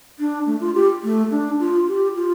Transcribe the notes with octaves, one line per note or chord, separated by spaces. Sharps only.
D4
A3
F4
G4
A3
D4
F4
G4
F4